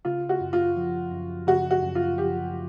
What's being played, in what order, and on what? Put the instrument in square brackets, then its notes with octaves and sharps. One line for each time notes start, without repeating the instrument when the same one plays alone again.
[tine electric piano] C#3 [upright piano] F4
[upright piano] F#4
[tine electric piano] F#2
[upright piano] F4
[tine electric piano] F3
F#2
[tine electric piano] C#3 [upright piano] F#4
[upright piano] F#4
[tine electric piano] F#2
[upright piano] F4
[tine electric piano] F3 [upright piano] G4